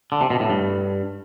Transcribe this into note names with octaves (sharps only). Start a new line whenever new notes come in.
D3
C3
B2
A2
G2